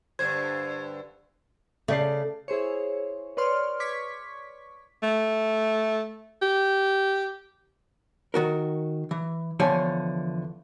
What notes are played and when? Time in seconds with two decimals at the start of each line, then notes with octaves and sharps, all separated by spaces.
0.19 G2 D3 C5 G#6
1.88 C#3 A3 D5 C7
2.48 E4 G#4 C5 C#5
3.37 B4 C#5 D5 C6 F6
3.80 C#6 D6 G#6 B6
5.03 A3
6.42 G4
8.34 D#3 F#4 A#4
9.11 E3
9.60 E2 D3 F3 C#5 G5 G#5